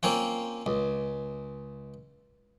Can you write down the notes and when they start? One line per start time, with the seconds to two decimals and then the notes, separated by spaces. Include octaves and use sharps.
0.03 A#3 C4 C#4 F4
0.66 C#2